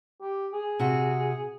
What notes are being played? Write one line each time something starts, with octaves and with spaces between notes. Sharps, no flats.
G4
G#4
C3 F#4